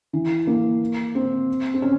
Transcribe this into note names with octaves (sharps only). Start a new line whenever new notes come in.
E3
A#3
C4
C4
C#4